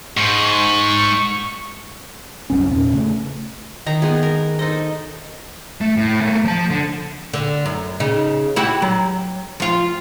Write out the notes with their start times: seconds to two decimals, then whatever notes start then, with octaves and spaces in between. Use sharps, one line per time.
0.17 G#2 C#6
2.50 D1 C2 F#2 C#4
2.68 E2 A#2 C#4
2.93 C#3 A3
3.86 D#3 D#4 A#5
4.02 G#3 B3 G#4
4.23 A#4
4.59 D#4 A4 C5 D#5
5.81 A3
5.97 A2
6.21 A3 A#3
6.44 F3 A5
6.71 D3
7.34 D3
7.66 F#2
8.00 C#3 D#4
8.56 E4 F#4 G4
8.82 F#3
9.60 F3 F4